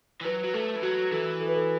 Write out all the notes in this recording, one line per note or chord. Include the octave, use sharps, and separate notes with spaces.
E3
F#3 B4
F#3
A3 A4
E3
F#3 F#4
E3 A4
A4
B4
A4